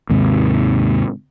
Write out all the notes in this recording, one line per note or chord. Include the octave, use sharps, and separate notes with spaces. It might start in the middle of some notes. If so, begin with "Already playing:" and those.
D#2 G#2 C3